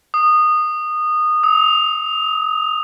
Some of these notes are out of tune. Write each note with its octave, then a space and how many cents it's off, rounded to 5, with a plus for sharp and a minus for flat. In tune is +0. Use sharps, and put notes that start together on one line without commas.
D#6 -20
D#6 +45